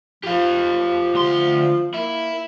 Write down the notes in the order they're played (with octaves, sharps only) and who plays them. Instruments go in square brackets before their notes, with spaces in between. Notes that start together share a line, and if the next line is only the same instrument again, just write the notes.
[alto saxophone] F3 [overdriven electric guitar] G4 F5
[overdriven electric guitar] D2 C6
[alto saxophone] A#3 [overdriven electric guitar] E4